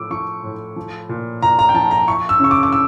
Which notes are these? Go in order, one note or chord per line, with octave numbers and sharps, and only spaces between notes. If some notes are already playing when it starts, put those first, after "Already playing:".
Already playing: A2 F3 D6 E6
F3 C#6
A2
F3
A#2
A#2 A#5
A#5
G5
F3 A5
A#5
E4 C#6
E6
C#3 C#6
D6
D6
E6